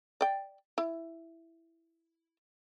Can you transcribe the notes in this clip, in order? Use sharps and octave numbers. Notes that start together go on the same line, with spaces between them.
D5 G5
E4